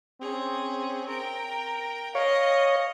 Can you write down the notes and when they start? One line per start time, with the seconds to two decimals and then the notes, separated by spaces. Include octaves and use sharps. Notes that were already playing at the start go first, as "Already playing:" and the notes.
0.22 C4 C#4 G#4
1.08 A#4 G5
2.15 C#5 D#5 F5